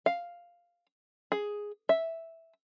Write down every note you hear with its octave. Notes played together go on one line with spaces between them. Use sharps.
F5
G#4
E5